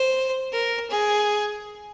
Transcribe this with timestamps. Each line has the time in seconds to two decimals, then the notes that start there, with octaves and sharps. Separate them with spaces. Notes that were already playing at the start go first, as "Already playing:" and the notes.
Already playing: C5
0.53 A#4
0.90 G#4